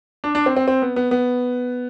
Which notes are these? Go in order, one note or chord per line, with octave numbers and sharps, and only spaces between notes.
D4
D4
C4
C4
C4
B3
B3
B3